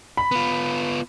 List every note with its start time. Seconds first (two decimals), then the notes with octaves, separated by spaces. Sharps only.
0.17 B5
0.31 B3 F4